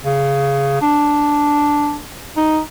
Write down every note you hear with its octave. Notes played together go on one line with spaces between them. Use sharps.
C#3
D4
D#4